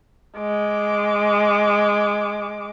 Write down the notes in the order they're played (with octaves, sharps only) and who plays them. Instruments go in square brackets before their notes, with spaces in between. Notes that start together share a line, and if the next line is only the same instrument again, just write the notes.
[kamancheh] G#3 D6